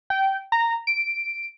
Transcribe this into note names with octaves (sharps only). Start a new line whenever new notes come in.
G5
A#5
D7